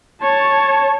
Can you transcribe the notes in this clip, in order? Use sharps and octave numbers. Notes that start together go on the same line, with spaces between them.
C#5 A5